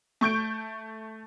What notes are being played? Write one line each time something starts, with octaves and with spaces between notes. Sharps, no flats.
A3 C#6 G6 D7